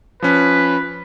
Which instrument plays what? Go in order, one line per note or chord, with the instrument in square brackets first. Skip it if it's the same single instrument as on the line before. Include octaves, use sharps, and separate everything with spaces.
[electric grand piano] F3 C#4 [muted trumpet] B4